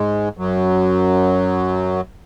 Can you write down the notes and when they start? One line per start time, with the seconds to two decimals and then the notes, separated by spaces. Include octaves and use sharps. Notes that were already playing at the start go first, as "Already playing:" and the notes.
Already playing: G#2 G#3
0.37 F#2 F#3